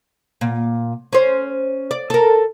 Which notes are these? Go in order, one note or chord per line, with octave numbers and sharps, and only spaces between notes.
A#2
C#4 C5
D5
A4 A#4